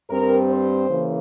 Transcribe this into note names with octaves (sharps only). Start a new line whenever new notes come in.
G2 G3 C4 A#4
C5
C#3 E3 A#3